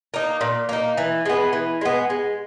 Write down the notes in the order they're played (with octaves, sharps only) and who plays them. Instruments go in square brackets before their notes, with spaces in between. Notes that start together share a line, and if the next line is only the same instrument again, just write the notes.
[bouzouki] A#3 D#4
A#2
A#3 D#4
E3
G#3 B3
E3
G#3 B3
G#3